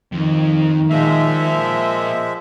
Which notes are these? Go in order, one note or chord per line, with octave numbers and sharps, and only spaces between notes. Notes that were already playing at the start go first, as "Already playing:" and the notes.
F2 D#3
F3 G#3 A#3 F4 E5